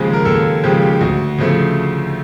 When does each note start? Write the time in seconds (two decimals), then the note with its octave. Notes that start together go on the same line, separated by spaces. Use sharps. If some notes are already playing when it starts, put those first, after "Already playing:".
Already playing: D#2 C#3 F3 G#3 G#4
0.13 A#4
0.25 D#2 A4
0.63 C#3 F3 G#3 G4
0.82 G4
0.93 G4
1.01 D2 F#4
1.38 C#3 F3 A3